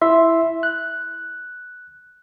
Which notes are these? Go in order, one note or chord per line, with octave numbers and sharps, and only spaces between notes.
E4 E5 C6
F#6